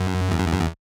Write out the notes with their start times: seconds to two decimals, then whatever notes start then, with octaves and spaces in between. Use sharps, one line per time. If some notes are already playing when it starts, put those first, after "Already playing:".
Already playing: F#2
0.31 E2
0.38 F#2
0.46 E2
0.53 F#2
0.60 E2